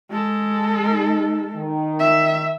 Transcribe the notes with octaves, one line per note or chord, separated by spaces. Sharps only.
G#3 A4
D#4
D#3
E5